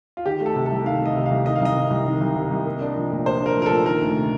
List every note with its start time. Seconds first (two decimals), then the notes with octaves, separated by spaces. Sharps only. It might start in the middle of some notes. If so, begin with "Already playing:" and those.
0.17 F4
0.26 D#3 G4
0.41 A3
0.46 A4
0.56 C3
0.66 A4
0.71 C2
0.86 D#3 F5
1.01 A3 D#5
1.16 C3
1.26 F5
1.31 C2
1.46 D#3 D#5
1.55 F5
1.61 C2 D#5
1.76 C3
1.90 C2
2.06 D#3
2.21 C2
2.35 C3
2.51 C2
2.66 A#3
2.81 D4
2.96 F3
3.11 A#2
3.26 A#3 C5
3.41 D4 A#4
3.56 F3
3.62 A#4
3.66 A#2 A4
3.86 D#3 A#4
4.01 D2
4.16 C3